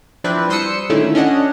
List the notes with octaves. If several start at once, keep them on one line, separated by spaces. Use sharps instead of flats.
F3 C4 D4 E4 B4
G3 C5 C6 D#6 E6 C#7
A#2 D3 D#3 A3 C#4 E4
C#4 D4 D#5 F#5